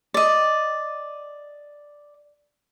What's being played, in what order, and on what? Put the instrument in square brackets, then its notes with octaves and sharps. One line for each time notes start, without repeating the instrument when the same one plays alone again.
[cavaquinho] D5 D#5